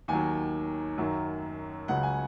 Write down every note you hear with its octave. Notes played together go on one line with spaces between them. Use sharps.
D#2 D#3 F#3 G#5
F#2 D#3 F#3
C#2 C#3 F#3 F#5
G#5